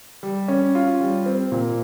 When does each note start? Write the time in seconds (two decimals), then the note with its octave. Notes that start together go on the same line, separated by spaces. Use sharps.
0.23 G3
0.48 C#4
0.75 F4
1.00 G3
1.26 C4
1.52 A#2